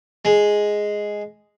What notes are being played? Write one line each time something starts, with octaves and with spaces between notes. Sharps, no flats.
G#3